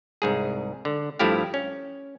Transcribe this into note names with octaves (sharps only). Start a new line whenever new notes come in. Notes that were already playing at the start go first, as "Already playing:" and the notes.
C2 G#2 G#4
D3
G2 F3 A3 E4 G4 F5
C#4